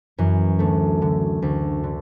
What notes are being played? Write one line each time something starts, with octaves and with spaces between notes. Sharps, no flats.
F#2 E3
D2 A3
D3
D2
D3